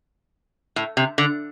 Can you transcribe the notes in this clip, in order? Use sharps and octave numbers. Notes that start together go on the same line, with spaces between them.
A2
C3
D3